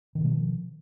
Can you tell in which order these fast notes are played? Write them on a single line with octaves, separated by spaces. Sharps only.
D#3 B2 G#3 F3